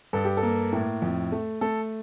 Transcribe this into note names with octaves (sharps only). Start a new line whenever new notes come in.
G2 A4
G4
A4
A#3
A2
F2
A3
A3 A4